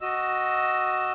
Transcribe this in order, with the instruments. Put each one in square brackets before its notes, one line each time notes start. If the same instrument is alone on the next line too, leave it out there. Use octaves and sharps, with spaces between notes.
[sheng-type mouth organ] F#4 D#5 E6